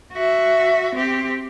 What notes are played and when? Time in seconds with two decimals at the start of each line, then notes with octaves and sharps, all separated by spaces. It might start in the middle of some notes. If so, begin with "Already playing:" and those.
0.13 F#4 E5
0.95 C4 G4